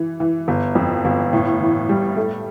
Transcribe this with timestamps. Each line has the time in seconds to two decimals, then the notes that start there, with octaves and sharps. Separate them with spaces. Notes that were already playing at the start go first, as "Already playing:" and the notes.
Already playing: E3
0.20 E3
0.48 G1
0.75 F2
1.05 G1
1.33 A2
1.60 E3
1.89 G3
2.17 A3